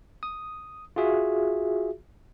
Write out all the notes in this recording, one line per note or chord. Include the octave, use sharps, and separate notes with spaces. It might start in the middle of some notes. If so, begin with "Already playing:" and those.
D#6
F4 F#4 G#4 E5